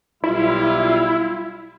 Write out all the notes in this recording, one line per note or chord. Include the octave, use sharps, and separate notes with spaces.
B1 G3 E4 F4